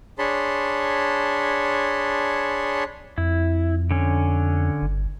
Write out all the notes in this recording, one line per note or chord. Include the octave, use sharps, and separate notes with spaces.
D4 G#4 C#5 A5 B5 C6
F2 E4
D3 C#4
G1